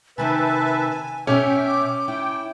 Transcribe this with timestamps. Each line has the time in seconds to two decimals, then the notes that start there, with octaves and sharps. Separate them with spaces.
0.18 C3 D#3 C4 B4 E5 G#5 A5
1.27 B2 C#4 C#5 E5 G5 D6
2.08 E4 G5